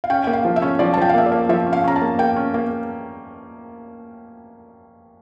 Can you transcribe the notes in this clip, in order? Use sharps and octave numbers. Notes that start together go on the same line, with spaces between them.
F5
C#4 G5
A#3 G5
F5
F3
E5
C#4
F3 D5
A5
F3 G5
F5
A#3 E5
D5
A#3
F3 E5
C#4
F5
C#4 A#5
A5
A#3
A#3 G5
C#4
A#3